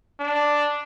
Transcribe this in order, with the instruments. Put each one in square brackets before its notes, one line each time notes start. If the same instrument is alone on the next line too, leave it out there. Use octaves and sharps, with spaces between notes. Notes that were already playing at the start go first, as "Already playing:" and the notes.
[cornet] D4